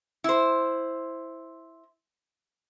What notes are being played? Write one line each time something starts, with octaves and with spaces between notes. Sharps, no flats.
E4 C5